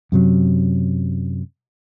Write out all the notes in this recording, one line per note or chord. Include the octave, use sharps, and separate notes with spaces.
F#2 C3 F#3